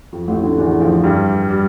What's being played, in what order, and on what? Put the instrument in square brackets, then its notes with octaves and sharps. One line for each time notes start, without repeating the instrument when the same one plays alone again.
[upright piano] F2
A1 A2
D2 D3
E2 E3
F2 F3
G2 G3
G3